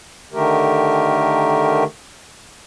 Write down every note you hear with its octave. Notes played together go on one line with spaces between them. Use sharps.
D3 D#3 A3 G4 A#4